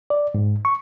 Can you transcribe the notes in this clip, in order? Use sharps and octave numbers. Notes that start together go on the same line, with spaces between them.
D5
G#2
C#6